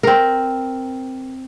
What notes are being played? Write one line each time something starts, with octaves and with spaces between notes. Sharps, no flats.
C4 A#4